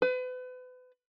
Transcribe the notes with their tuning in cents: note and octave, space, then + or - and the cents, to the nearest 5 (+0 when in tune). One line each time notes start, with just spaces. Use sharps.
B4 +35